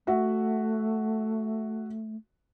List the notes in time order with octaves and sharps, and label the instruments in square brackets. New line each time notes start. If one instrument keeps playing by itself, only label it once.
[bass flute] A3 [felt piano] F#4 E5 F#5